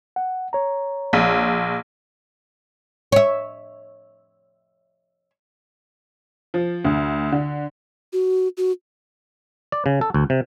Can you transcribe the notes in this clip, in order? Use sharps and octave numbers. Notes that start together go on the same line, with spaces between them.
F#5
C#5 A#5
A#1
C#5 E5
F3
D2
D3
F#4
F#4
D5
C#3
A4
D2
C3